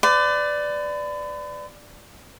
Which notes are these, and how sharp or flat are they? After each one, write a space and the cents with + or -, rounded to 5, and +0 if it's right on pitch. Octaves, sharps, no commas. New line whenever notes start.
B4 +40 D5 +5